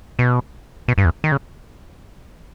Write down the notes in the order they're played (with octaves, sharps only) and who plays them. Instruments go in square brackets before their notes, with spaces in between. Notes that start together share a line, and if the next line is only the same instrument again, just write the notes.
[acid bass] B2
B2
G2
E2
D#3
C#3